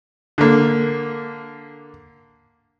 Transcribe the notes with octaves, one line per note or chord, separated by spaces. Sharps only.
D3 A#3